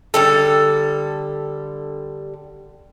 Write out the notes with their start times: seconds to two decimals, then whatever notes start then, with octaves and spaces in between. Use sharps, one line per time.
0.14 D3 G3 A4